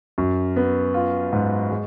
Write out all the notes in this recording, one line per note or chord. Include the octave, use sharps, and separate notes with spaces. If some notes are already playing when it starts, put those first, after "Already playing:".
F#2
B3
F4
G#2
G#3